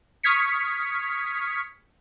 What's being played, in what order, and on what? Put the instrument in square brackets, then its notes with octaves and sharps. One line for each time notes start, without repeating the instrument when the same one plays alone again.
[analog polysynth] C#6 D#6 F6 G#6 B6 C#7